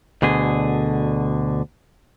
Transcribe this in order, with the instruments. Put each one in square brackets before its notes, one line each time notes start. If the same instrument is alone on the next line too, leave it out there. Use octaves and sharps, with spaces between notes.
[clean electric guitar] D2 B2 D3 G#4